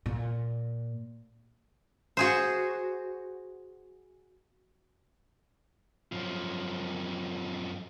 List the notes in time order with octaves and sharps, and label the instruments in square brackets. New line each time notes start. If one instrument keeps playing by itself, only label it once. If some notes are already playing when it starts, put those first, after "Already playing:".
[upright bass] A#2
[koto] F#4 G#4 C5
[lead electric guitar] F#2 F3